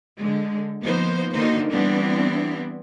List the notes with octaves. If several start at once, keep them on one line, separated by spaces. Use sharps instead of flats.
D3 G#3
F3 A#3 B3 D#4 C5
D3 D#3 A#3 D#4 F#4 C5
E3 G3 B3 C4 D4 E4